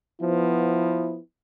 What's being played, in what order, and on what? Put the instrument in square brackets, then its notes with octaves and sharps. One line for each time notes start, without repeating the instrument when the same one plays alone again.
[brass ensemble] F3 B3 [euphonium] E4